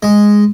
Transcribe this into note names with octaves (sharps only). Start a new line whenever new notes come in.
G#3